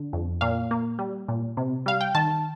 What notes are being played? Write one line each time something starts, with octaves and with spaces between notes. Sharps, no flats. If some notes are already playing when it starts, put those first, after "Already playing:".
Already playing: D3
F2
A#2 F5
A#3
G3
A#2
C3
G3 F5
G5
D#3 A5